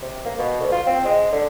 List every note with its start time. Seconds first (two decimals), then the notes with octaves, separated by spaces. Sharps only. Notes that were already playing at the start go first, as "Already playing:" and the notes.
0.02 C3
0.25 A#3
0.39 B2
0.60 D2
0.72 F4
0.87 C4
1.05 G#3
1.32 D3